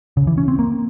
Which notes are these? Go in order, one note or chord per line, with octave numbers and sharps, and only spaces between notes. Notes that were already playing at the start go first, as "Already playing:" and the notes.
C#3
E3
C#4
C4
A#3